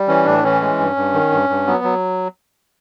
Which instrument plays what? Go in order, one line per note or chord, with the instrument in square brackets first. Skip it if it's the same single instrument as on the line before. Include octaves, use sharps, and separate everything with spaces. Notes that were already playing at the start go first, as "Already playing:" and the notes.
Already playing: [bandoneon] G3
E3 C#4
A2 D4
E3 C#4
G#3
G2
G2
D#3
G2
G2
F#3 B3
F#3